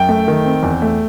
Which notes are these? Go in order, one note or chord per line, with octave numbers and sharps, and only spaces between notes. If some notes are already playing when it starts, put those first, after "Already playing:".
Already playing: F#2 G5
A3
D#3
C4
E2
A3